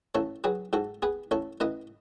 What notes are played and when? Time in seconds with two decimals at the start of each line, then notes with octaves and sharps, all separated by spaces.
0.15 A1 A4 C#5
0.44 F#3 G#4 B4
0.73 G#2 F#4 A4
1.02 B3 G#4 B4
1.31 A1 A4 C#5
1.60 A1 B4 D#5